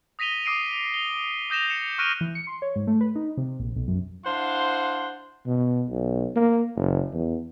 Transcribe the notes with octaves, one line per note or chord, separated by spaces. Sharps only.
D#6 A#6 B6 D#7 F7 G7
D6 D#6 C7 D7 D#7
G7
D#6 G6 A#6 E7 F7
C#7 E7
C#6 F6 F#6 A#6 D7 D#7
E3
C#7
C6
C#5
G#2
A3
B4
D#4
C3
A#1
B1
F#2
D4 E4 C5 F5 F#5 C6
B2
B1
A#3
F#1
E2